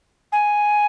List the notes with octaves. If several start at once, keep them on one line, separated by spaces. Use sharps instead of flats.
G#5